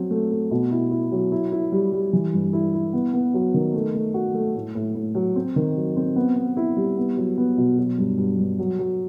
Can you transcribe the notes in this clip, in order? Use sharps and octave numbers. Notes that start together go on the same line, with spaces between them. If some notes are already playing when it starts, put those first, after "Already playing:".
Already playing: F#3 C4
A3
A3
B2
E4
E4
F#3
E4
E4
G3
G3
E3
G2
E4
E4
B3
B3
F#3
D#3
A3
A3
F#4
A3
A2
A2
A2
F#3
C4
D#3
F#3
C4
B3
B3
E4
G3
B3
F#3
B3
B2
F#3
G2
G2
G2
F#3
F#3